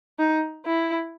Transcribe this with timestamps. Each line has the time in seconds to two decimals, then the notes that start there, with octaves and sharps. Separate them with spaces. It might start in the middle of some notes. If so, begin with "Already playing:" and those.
0.19 D#4
0.66 E4